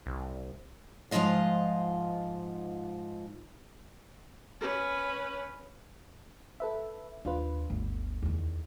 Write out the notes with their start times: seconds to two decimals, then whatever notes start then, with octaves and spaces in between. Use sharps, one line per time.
0.06 C2
1.11 G#2 F3 A#3 F4 D#5 F5
4.60 C#4 B4
6.60 A4 B4 E5
7.25 D#2 D4 F4 B4
7.70 G1 D2
8.22 E2 D#3